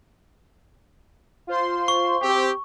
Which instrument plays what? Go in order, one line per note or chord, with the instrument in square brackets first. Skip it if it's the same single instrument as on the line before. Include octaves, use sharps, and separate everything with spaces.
[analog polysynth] F4 C5 C6
[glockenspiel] C#6
[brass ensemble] C4 G4